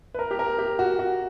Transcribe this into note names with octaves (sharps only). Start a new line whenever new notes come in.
B4
A#4
G4
A#4
G4
F#4
F#4